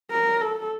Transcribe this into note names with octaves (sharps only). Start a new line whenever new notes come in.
A#4
A4